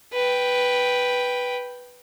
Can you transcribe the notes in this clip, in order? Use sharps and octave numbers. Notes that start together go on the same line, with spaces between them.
B4 G5